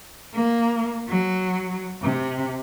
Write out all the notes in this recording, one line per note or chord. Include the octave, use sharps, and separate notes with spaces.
A#3
F#3
C3